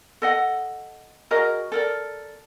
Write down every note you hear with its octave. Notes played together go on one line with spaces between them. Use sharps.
A4 D#5 F#5
F#4 G#4 A#4 D#5
A4 A#4 D5